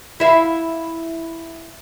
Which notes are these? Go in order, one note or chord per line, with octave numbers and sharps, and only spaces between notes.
E4 E5 F5